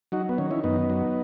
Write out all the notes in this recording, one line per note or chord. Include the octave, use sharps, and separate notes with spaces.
F#3 D#4 F#4
B3
D#3 C#4
C#4 E4
F#2 B3 D#4
F#3